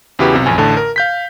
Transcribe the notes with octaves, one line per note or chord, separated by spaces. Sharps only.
E2 C#3 E4 F#4 G4 B4
B1 C3
A1 F2 G#5
A1 A2 D3 A5
A#4
F5 G6 B6